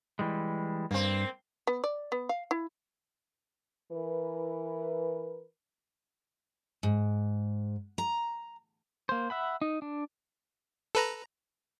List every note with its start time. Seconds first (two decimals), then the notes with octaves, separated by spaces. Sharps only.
0.19 E3 G3 G#3
0.91 G2 A#3 C4
1.67 B3
1.84 D5
2.12 B3
2.29 F5
2.51 E4
3.92 E3 A#4 B4
6.83 G#2
7.98 A#5
9.09 A#3 C5
9.30 E5 F#5 B5
9.62 D#4
9.82 D4
10.95 A4 B4 A#5